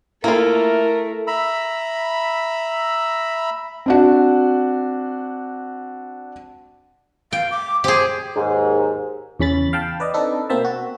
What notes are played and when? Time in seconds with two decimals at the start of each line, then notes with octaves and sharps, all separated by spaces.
0.24 A3 A#3 E4 F4 A#4
1.27 E5 A#5 B5 E6
3.86 C4 D4 F#4
7.33 F5 G5
7.51 D6
7.84 G4 G#4 C5
8.36 D#2 G#2
9.39 E2 C#3 C#4 B5 A6
9.73 F5 G5 A5
10.00 B4 D5 D#5
10.14 C4 D4 D#4 A4 B4
10.50 B2 A#3 C4 C5 E5 A5
10.65 F#4